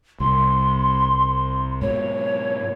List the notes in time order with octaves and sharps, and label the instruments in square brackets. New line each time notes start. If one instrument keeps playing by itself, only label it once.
[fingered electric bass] C2 [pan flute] C6
[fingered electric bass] G#2 B2 [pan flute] C#5